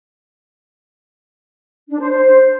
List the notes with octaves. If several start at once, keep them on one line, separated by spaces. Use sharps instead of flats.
D4
C5
C5